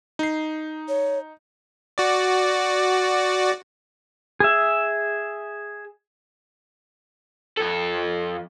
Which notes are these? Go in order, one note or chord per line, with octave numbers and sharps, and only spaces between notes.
D#4 C7
C#5
F#4 D5
G#4 E5
F2 A4